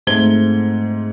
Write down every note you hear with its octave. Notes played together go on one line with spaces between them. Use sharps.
G#2 A3 C4 G#6 G7